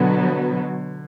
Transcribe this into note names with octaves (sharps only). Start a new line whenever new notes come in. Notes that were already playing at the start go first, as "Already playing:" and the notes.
Already playing: B2 D3 F#3 B3